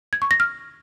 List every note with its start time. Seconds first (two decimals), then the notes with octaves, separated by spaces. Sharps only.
0.13 G#6
0.22 C#6
0.31 A#6
0.40 F6